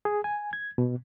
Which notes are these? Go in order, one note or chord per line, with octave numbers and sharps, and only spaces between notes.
G#4
G#5
G#6
B2